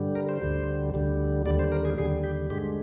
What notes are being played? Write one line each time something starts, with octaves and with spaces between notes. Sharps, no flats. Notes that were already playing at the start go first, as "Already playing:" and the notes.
Already playing: G2 D3 G3
A#4
C5
D2 D3 G3
D2 D3 G3
D#2 D3 G3 D5
C5
A#4
G#4
D#2 D3 G3 G#4
G4
G2 D3 G#3 G4